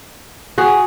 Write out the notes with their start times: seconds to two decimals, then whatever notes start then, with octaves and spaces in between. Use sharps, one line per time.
0.58 F#4 G#4